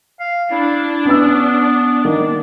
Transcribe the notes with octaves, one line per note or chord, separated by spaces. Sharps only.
F5
D4 E4
B3 C#4 B4 E6
D#3 A#3